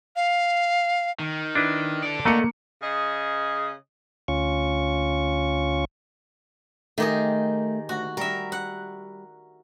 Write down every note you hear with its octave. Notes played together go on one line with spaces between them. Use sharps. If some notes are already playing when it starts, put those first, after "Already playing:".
F5
D#3
D4 E4 B4
A4 D5
A3 A#3 D#5 F#5 C#7
C#3 G#4 D#5
D2 C#4 F4 C#6
D#3 A3 G4 G#4 A#4
D2 F#4
G3 A#4 E5
F#5